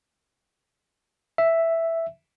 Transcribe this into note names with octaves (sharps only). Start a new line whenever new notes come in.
E5